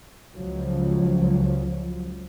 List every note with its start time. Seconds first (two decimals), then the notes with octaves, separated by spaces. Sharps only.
0.35 C#2 F3 F#3